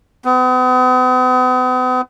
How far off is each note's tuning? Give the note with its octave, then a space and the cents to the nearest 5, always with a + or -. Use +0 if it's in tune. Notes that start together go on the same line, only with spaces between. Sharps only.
B3 +40